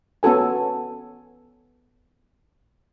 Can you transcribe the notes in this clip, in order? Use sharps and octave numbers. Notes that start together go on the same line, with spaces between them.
B3 C#4 F#4 A4 G#5